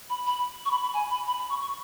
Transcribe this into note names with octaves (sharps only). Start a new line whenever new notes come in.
B5
B5
C#6
B5
B5
G#5
B5
B5
B5
C#6
C#6